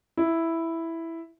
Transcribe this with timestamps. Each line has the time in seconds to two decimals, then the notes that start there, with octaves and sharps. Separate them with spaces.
0.17 E4